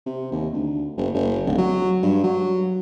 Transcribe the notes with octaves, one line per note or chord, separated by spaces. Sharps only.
C3
D#2
D2
F#1
F#1
D1
F#3
G2
F#3